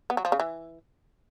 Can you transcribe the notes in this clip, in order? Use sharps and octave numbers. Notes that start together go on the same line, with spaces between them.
B3
F#3
F3
C#3
E3